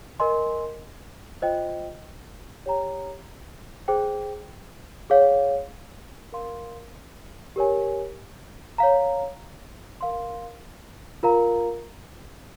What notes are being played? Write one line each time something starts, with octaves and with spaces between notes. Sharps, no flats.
A#4 D#5 G#5 C6
F4 C5 D#5 G5
G4 C#5 G5 A#5
G#4 C5 G5
G#4 C#5 F5
A#4 F5 C6
G4 A#4 C#5 G#5
C#5 F5 A#5
A#4 F5 C6
F4 A#4 F5 A#5